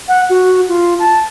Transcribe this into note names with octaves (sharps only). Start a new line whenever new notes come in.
F#5
F#4
F4
A5